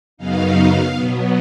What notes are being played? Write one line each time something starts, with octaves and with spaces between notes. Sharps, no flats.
F#2 C#3 F#3 B3 D#4 F5
B2 F#3 B3